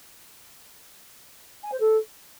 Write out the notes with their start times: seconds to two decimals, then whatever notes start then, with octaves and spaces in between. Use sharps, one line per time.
1.63 G#5
1.72 C5
1.80 A4